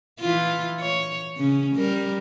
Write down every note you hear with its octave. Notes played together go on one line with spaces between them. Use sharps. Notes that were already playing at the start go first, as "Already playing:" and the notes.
E3 E4 F4
C#5
C#3 C#4
G3 A#4